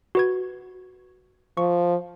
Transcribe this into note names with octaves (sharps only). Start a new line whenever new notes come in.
F#4 B4 G#6
F3 C#6